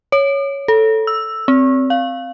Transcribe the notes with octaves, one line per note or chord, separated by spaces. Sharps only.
C#5
A4
E6
C4
F5